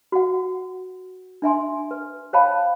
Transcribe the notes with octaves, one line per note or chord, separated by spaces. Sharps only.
F#4 F#5
D4 E5 G#5 C6
B4
C5 C#5 F5 G5 A5 B5